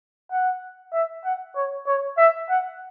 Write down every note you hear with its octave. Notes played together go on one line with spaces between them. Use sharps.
F#5
E5
F#5
C#5
C#5
E5
F#5